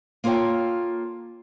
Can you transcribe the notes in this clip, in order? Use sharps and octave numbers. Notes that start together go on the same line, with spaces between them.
A#3 F4 A4 C#5 G5